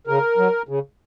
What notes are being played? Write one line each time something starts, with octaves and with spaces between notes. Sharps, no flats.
C#3 A#4
F#3
C#3